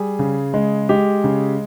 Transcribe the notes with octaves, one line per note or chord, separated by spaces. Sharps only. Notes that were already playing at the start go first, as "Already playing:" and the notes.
Already playing: G3 G#4
C#3
G#3
G#3 G4
C#3